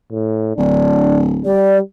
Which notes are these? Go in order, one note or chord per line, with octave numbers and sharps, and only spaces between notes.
A2
D1 D4
G3 D5